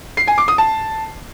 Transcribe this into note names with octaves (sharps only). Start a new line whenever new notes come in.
C7
G#5
D6
D#6
A5